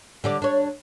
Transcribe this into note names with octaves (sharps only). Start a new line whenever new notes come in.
D3 G3 D5
D4 C#5